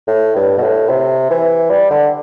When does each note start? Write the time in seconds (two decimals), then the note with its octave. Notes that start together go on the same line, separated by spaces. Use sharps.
0.07 A2
0.36 G2
0.57 B2
0.63 A2
0.89 C3
1.30 E3
1.70 G3
1.90 D3